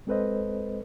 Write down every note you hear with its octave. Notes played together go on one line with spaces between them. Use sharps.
G#3 C4 A4 B4 C5 D#5